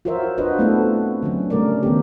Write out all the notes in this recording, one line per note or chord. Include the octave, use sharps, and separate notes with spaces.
F4 F#4 A#4 C5 C#5 E5
D4 F4 F#4 B4 C5 D#5
A3 B3 C4 E4 F#4 A4
D3 F#3 C#4
C#3 G3 A3 C#4 A#4 D5
D#3 B3 G4